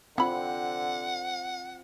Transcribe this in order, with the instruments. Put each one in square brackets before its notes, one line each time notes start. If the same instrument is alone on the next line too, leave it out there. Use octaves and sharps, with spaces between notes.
[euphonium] D3 [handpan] C4 F4 [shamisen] E4 B5 [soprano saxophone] F#5